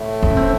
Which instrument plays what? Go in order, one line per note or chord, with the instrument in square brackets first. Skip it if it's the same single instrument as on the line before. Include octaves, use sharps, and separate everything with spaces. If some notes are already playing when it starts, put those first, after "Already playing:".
Already playing: [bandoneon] A2 A3
[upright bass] C4
C#4
C4